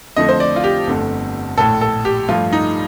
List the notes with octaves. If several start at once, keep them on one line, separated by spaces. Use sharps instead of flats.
F2 D3 F3 A3 D#5
C5
D5
F4
G4
G1 F2 D3 A3
A#1 A2 A3 A4
A4
G4
G2 F3 A3 F4
D#4